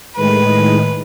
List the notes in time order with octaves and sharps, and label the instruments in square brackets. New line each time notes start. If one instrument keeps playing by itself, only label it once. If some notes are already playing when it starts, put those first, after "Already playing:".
[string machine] A2 D#3 G#3 [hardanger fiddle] B4